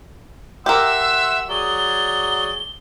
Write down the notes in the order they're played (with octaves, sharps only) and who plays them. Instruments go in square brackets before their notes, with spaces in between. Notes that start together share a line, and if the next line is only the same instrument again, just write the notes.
[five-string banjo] G4 A#4 [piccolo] E5 [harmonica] F#5 C6 E6
[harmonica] F#3 G#4 D5 [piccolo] G7